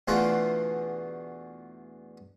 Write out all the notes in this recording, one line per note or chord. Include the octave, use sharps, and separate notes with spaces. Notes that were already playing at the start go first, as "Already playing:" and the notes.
E2 B2 D3 A3 F4 F#5